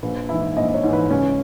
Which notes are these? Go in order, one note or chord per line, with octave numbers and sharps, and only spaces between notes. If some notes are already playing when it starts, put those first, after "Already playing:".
A#1 B4
G#2 E3 E4
A#1 D#5
C#5
G#2 E3
B4
C#2 C#4